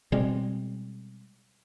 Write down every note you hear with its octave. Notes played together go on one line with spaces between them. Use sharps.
B2 G3 G#3 C4